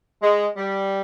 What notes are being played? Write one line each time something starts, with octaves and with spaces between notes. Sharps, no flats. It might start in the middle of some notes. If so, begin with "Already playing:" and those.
G#3
G3